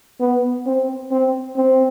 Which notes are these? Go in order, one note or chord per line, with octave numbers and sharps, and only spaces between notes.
B3
C4
C4
C4